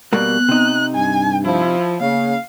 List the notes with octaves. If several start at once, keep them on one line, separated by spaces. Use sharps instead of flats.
B2 G3 A#3 B3 F#6
C3 D#4
G2 G#5
F3 E4
C#3 A#3 F5